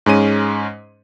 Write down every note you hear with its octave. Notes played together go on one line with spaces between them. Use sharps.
G#2 G#3 C#4 D#7